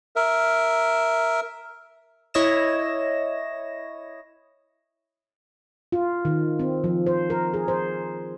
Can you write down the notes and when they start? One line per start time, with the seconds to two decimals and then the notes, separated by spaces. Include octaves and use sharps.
0.16 A#4 E5
2.34 E4 C#5 D#5 A#6 E7
5.92 F4
6.25 D#3
6.60 C4
6.84 F3
7.07 C5
7.30 A#4
7.54 G#4
7.68 C5